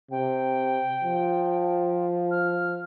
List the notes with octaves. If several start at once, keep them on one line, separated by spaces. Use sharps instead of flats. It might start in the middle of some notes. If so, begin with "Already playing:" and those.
C3 G5
F3
F6